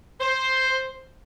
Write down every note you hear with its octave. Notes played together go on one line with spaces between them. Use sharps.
C5